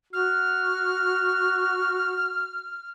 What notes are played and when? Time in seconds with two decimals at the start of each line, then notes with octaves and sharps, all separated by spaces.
0.13 F#4 F6